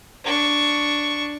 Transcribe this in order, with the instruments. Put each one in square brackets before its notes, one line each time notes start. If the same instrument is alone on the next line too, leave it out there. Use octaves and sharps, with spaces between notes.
[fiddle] D4 C#6